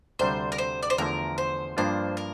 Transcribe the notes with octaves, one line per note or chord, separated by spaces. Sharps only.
D2 C3 G3 D4 C5
A#4
C5
D5
C5
E2 D3 F3 A3 E4 A#4
C5
G2 F3 A#3 D4 F4 C5
A#4